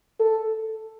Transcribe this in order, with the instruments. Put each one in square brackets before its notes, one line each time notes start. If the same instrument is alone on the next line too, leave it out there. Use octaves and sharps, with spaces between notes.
[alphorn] A4